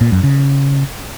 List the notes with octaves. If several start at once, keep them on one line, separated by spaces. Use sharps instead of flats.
A#2
F#2
C#3